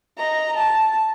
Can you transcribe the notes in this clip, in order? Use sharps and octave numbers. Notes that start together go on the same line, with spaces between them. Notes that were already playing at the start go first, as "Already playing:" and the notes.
D#5 A#5
A5